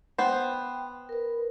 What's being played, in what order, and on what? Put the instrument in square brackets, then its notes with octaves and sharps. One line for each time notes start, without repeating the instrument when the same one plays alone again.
[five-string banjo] B3 C5 [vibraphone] G5
[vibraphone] A#4 B4